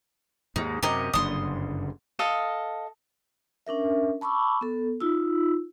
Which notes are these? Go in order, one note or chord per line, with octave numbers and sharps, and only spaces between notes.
D#2 G#2 D#4
F#2 C3 G4 A#4 D#5
F#1 G2 D3 C6 D#6
A4 D#5 F5
C#4 D4 A#4 E5
A5 B5 C#6 D6 E6
B3 A4
D#4 F4 E6